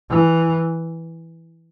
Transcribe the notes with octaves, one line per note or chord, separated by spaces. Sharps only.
E3